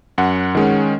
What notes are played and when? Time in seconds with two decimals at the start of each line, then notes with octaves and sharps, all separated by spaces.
0.18 F#2 F#5
0.55 D#3 G#3 C#4